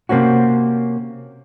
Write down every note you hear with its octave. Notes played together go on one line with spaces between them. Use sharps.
C3 A#3 C4 C#4 F#4